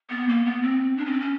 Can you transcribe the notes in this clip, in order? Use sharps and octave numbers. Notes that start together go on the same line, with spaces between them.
B3
A#3
B3
C4
D4
C#4
C4
C#4